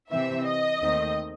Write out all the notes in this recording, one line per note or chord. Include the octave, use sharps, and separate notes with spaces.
C3 E3 C4 E5
D#5
D#2 D#3 A3 C4